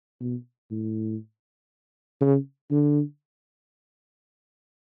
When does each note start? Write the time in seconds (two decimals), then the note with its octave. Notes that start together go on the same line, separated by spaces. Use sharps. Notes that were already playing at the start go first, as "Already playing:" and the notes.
0.20 B2
0.71 A2
2.21 C#3
2.71 D3